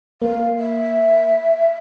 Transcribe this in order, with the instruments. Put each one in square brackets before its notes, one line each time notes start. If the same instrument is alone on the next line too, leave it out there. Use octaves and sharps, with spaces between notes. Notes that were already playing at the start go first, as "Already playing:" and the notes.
[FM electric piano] A#3 [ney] F5
[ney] E5